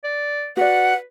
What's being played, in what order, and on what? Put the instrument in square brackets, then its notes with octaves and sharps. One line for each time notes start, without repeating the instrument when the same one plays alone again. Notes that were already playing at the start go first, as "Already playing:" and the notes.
[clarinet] D5
[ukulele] F#4 D5 [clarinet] B4 [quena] F#5